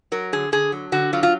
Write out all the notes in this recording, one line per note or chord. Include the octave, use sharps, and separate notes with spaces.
F#3 A#4
D3 G#4
D3 G#4
F#3
D3 F#4
F#3 F4
F4